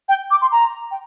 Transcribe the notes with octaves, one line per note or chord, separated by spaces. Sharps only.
G5
D6
C6
A#5
G5